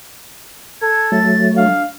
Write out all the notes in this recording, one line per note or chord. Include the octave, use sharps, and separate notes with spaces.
A4 G#6
F#3 A3 A6
D4 F5